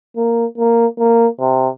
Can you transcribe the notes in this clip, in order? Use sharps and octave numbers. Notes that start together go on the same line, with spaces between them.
A#3
A#3
A#3
C3